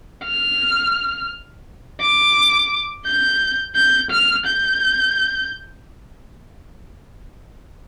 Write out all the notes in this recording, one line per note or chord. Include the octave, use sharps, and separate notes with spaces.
F6
D6
G6
G6
F6
G6